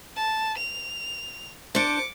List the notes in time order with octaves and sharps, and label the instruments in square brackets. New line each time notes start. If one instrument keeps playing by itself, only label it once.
[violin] A5
F7
[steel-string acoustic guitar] D4 C5 [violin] D6 C#7